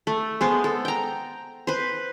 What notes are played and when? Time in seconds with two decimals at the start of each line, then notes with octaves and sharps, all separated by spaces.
0.07 A3
0.41 G#3 B3 C5
0.64 A4
0.85 G5 A#5
1.67 B4 C5